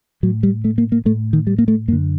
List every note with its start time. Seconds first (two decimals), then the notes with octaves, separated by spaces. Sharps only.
0.23 A2 F#3
0.43 G3
0.64 A3
0.78 A#3
0.92 A#3
1.05 A2 A3
1.33 D#3
1.47 G3
1.58 A#3
1.68 A3
1.88 F#2 A#3
1.92 D3